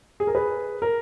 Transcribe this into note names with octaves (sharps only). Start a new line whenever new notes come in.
G#4
A#4
G#4 B4
A#4